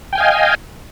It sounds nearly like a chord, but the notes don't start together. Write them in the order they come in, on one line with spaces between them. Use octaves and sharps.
G5 G#5 F5 D#5